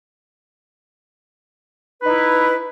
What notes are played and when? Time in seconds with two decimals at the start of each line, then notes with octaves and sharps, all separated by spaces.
2.01 B4
2.05 D#4
2.09 E4